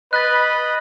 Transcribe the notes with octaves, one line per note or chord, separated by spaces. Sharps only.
B4 D#5 B5 F#6 A6